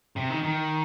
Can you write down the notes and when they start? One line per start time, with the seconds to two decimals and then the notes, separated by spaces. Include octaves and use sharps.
0.16 C3
0.30 D#3
0.43 D#3